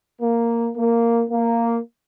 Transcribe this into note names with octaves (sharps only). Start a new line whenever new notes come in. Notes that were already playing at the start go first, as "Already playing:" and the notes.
A#3
A#3
A#3